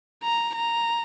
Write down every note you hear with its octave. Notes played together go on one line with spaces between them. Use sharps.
A#5
A#5